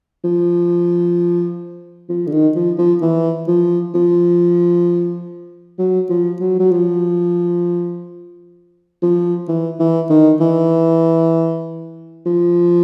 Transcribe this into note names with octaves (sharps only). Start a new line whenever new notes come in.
F3
F3
D3
D#3
F3
F3
E3
F3
F3
F#3
F3
F#3
F#3
F3
F3
E3
E3
D#3
E3
F3